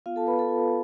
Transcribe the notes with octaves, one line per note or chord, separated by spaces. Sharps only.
B3 F4 F5
A4 A5
B3 B4 B5
A4 A5
F4